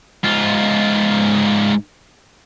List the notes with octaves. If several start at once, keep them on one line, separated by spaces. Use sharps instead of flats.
G#2 F4